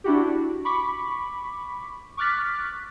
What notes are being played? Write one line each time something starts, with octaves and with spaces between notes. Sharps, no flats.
D4 E4 F#4 G4
B5 C#6 D6 B6
C#6 D6 F6 F#6 A6 B6